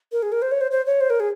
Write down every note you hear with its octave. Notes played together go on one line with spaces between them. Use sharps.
A#4
G#4
A#4
C5
C#5
C5
C5
C#5
C5
A#4
G#4